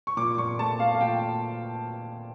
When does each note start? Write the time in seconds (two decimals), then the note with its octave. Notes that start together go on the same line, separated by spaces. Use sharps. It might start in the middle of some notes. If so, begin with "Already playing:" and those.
0.07 C#6
0.17 A#2 D6
0.38 A#2 C#6
0.59 A3 A5
0.80 A3 F5
0.95 F5
1.01 A#2 G5